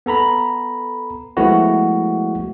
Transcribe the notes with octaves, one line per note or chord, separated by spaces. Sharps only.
B3 A4 A#5 B5
F3 G#3 A3 B3 E4 F#4